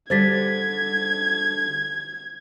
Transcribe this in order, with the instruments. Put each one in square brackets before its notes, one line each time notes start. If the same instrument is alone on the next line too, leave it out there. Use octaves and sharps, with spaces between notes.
[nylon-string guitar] D3 G3 [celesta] C5 A6 B6 [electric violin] G#6